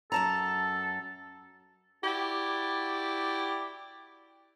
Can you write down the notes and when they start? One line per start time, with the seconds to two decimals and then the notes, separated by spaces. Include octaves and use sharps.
0.12 F#2 A4 A5 A#5
2.03 E4 F#4 G4 D5